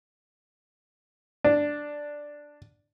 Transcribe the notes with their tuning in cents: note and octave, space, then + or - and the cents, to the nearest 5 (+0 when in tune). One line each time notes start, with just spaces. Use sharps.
D4 +0